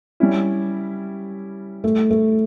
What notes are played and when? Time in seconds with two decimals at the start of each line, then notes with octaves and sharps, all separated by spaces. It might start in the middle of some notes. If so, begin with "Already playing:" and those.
0.20 G3 C#4 E4
1.84 A3
2.11 A3